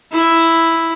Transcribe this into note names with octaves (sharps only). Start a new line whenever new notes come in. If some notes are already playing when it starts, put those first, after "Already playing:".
E4